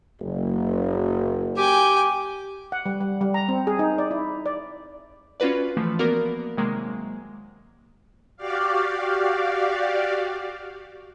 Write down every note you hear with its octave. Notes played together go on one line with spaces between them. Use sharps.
F#1
G4 G5 G#5
F#5
G3
G3
G3
A#5
C4
G#4
D#4
D5
E4
D5
C#4 F4 F#4 B4 D5
E3 F3 A3
A#3 B3 F#4 A#4 D5
C3 D#3 F#3 G#3 A#3
F#4 G4 D5 F5